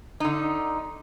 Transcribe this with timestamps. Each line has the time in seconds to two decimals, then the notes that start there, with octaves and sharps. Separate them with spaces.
0.20 D3 D#4